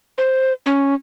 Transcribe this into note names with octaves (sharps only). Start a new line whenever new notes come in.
C5
C#4